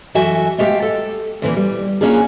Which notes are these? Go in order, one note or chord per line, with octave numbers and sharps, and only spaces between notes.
F#2 E3 F#4 A4 E5 G#5
G#3 A3 G4 D#5 F5 G5
A4
D2 A#2 E3 A#3
G3
A#3 C#4 D4 F4 G#4